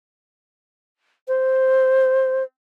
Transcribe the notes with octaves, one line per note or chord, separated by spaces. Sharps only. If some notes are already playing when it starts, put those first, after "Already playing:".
C5